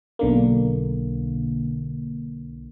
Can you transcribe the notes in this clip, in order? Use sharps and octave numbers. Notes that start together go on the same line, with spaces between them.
B1 D3 A#3